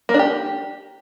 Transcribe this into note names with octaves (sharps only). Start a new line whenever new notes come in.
A#3
D4
G4